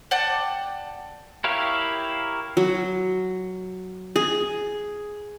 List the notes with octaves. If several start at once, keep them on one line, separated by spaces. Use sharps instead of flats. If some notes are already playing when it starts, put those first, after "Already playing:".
D5 F#5 G5 A5
E4 G4 A#4 C#5 F5
F#3
G#4